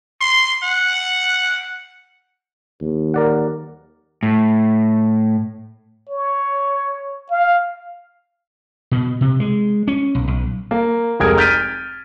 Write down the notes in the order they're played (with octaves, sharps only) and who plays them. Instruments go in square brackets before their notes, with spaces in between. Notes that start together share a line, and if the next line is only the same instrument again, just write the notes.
[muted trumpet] C6
F#5
[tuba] D#2
[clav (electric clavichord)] A#4 D5 F#5
[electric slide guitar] A2
[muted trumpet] C#5
F5
[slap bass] B2
C3
G#3
C#4
B1
B1
[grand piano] A#3
F1 G#3 G#4 A#4 G#6 D7
F6 G6 A6 B6 D7 D#7